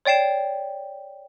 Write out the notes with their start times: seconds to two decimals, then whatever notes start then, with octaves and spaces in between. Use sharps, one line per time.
0.05 C#5 D5 G5 C7 E7